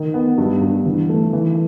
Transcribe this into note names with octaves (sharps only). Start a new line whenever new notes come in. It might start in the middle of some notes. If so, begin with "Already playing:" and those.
Already playing: D#3
B3
G2
G2
E3
A3
E3